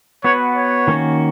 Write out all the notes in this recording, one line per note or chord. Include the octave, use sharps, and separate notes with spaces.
B3 F#4 B4 C#5
C#5
D#3 A#3 C#4 F#4